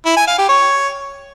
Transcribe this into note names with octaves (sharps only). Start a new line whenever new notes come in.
E4
G#5
F5
G4
C#5